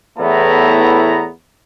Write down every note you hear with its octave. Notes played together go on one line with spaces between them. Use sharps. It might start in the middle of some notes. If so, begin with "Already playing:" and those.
E2 A2 A3 B3 E4 A#5